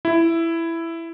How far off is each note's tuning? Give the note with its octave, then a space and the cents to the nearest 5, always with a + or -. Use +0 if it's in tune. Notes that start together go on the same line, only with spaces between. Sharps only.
E4 +10